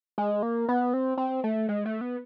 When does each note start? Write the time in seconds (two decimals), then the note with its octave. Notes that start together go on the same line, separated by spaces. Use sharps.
0.18 G#3
0.43 A#3
0.69 B3
0.94 C4
1.18 C4
1.44 A3
1.69 G#3
1.85 A3
2.01 B3